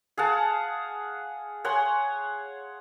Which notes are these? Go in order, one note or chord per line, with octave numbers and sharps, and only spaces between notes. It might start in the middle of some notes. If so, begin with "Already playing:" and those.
G#4 F5 F#5 A5
C#5 F#5 G#5 C6